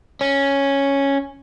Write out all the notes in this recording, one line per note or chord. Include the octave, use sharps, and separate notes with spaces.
C#4